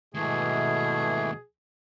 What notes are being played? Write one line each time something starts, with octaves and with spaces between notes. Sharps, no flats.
D#2 G#2 B2 E3 A3 G#4